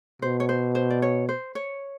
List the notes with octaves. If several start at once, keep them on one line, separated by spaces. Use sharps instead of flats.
B2 C5
C#5
C5
C5
D5
C#5
C5
C#5